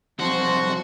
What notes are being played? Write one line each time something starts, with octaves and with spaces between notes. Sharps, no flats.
B1 C3 F3 F#4 C6